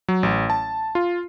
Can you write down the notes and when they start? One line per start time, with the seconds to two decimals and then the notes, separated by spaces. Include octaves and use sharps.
0.08 F#3
0.23 A1
0.50 A5
0.95 F4